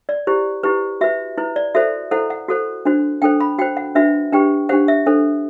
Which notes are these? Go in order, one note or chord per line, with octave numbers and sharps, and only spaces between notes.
D5
E4 G4 C5
E4 G4 B4
F#4 B4 E5
E4 B4
D5
F#4 A4 C5 E5
E4 A4 C5 F#5
F#5
F#4 A4 C5
D4 F#4 C5
D4 A4 C5 G5
B5
F#4 C5 G5
F#5
D4 F#4 B4 E5
D4 G4 B4 G5
D4 G4 C5 F#5
E5
D4 A4 C5